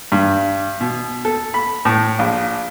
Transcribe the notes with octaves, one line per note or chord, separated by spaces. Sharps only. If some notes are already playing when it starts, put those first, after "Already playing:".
G2
B2
A4
B5
A2
A#1